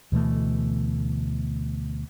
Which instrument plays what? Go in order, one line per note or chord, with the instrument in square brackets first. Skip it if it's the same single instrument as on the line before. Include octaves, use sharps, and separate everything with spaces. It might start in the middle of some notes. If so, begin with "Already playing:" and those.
[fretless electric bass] D2 B2 E3 A3